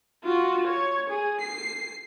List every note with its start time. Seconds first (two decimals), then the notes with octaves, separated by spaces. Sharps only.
0.24 F4 F#4
0.67 C#5
1.10 G#4
1.41 C7